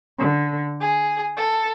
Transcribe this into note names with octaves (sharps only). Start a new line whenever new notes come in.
D3
G#4
A4